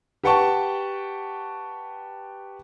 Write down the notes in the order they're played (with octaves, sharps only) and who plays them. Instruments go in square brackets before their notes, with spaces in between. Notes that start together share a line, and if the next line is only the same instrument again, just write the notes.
[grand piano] G4 B4 F#5 G5 A5 C#6